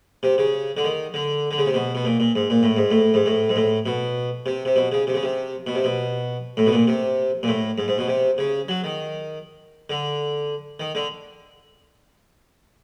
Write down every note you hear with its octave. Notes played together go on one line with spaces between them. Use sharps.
C3
C#3
D3
D#3
D3
D3
C#3
C3
B2
B2
A#2
A#2
G#2
A#2
A2
G#2
A2
G#2
A2
G#2
A2
B2
C3
C3
B2
C#3
C3
C#3
C3
B2
C3
B2
A2
B2
A#2
C3
A#2
A2
G#2
G#2
B2
C3
C#3
F#3
D#3
D3
D#3
D3